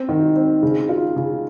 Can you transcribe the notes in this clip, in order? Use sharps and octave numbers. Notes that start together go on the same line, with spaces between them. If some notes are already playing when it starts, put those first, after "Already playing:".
Already playing: C4
D#3
C4
C#3
F4
C#3